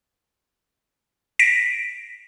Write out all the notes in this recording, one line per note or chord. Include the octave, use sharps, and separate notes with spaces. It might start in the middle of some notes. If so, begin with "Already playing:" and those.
A#6 B6 D7